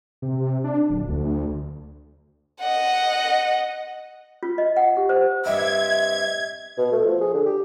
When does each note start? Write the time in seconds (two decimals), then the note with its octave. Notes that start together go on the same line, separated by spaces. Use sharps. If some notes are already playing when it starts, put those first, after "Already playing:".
0.22 C3
0.64 D4
0.90 D1
1.08 D2
2.61 D#5 F#5
4.43 F4
4.58 D#5
4.77 F#5
4.97 G4
5.09 C5
5.45 G2 C4 D#4 E5 G#6
6.78 B2
6.92 A3
7.05 F3
7.20 G#4
7.34 D3
7.46 G4